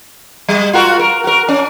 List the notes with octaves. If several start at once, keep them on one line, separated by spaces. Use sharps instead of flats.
G3
F4 F#4 A#4
A#4
F#4 A#4
C#4